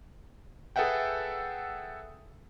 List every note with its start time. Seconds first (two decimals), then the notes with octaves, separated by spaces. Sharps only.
0.76 G#4 A4 B4 E5 F#5 G5